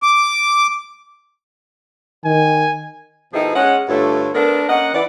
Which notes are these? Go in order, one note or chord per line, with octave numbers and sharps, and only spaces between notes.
D6
D#3 G#5
B2 F3 D#4 E4 G#4 A4
G#3 C#4 F#5
G2 D3 A3 F4 A4 C#5
A3 B3 D4 A4 A#4
A#3 C#4 D#5 F#5
E3 D5